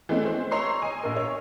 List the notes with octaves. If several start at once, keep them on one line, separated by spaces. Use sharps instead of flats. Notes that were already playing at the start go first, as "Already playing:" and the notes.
E3 G#3 A3 C4 C#4
C5
C#5 A#5 C6 C#6 E6 C7
D#5 G#5
A#1 A#4
C#5